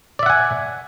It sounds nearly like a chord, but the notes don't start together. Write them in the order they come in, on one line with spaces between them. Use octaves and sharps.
D5 E5 F#5 G#5